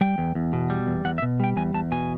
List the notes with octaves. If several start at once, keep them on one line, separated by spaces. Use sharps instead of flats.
G3 G5
E2
E2
B2
G3
E2
E2 F#5
E5
B2
G3 G5
E2 G#5
E2 A5
B2 G#5